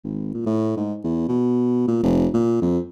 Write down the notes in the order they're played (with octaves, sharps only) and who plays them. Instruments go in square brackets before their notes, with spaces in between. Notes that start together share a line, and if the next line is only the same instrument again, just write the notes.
[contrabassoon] G#1
A#2
A2
G#2
E2
B2
A#2
F1
A#2
F2